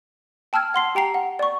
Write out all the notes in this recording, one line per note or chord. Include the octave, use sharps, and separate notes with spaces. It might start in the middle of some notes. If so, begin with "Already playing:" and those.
G5 A5 E6 F6 G#6
F#5 C6 C7
G4 G5 A#5 C7
F#5
D5 C#6